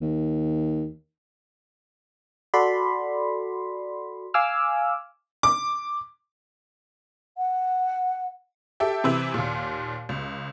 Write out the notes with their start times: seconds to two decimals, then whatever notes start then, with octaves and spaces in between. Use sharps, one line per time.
0.02 D#2
2.54 F#4 A4 D5 B5 C6
4.34 F5 G#5 D6 E6 F6
5.43 D6
7.37 F#5
8.80 G4 A4 E5 G5
9.04 C3 E3 C4 E4
9.34 D#2 A#2
10.09 C#2